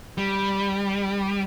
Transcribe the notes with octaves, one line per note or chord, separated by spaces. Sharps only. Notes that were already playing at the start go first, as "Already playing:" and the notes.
G3